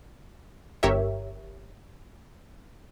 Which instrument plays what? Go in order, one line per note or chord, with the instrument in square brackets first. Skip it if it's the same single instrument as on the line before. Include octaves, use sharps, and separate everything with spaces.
[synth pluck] G1 G4 A#4 C#5 E5